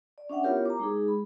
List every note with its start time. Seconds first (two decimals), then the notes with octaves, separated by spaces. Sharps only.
0.18 D5
0.29 C#4 D4 E5 F#5 G5
0.43 B3 E4 F4 G4 A#4 C#5
0.66 A#5 D6
0.79 G#3 D#4 G#4
1.08 B5